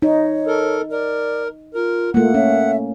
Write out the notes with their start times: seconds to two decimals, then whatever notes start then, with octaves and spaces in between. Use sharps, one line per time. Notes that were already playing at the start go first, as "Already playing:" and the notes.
0.02 D#4 C#5
0.47 A4 A#4
0.91 A#4 D5
1.74 F4 A#4
2.14 A3 A#3 F4 F#5
2.34 C#4 E5